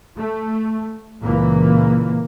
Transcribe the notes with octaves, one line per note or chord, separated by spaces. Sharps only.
A3
C#2 A#2 E3 A#3